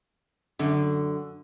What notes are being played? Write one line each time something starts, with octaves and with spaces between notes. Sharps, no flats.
F#2 D3